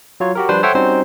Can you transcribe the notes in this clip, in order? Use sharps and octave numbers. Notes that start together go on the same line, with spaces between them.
F#3 F4 C#5
F#4 G4 A#4
F3 G3 D4 B4 C5
A4 C5 C#5 E5 F#5 G5
G3 C4 C#4 D#4 F#4 C5